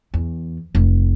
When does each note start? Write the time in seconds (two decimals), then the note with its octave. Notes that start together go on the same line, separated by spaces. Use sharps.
0.14 E2
0.75 F1